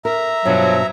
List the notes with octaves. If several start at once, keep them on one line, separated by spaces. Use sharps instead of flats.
A#4 E5 A#5
G2 B2 F3 F#3